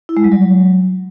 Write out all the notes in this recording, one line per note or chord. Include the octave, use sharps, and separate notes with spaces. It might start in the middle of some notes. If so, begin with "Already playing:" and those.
E4
G#3
G3
F#3